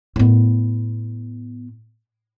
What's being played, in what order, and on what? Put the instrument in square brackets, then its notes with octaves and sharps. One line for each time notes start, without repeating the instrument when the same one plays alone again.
[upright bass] A2 B3